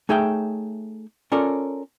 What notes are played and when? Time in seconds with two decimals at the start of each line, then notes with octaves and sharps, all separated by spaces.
0.09 A3 D#4 G#4 C#5 E5 G5
1.32 C#4 F4 A4 A#4 C#5 D5